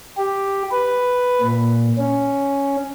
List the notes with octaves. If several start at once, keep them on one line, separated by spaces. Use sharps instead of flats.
G4
B4
A#2
C#4